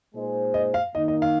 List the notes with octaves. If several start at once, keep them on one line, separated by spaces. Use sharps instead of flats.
A#2 G#3 D#4 G#4 C5
D#5
F5
D#3 A#3 D#4 D#5
D#5
F5